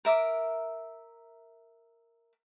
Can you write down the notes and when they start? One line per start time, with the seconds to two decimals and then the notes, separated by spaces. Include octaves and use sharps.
0.05 A#4 E5 D6